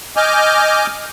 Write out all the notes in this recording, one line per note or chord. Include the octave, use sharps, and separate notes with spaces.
D#5 G#5 D6 F6 G6